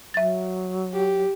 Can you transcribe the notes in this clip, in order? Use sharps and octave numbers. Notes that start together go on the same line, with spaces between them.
F#3 E5 A6
G4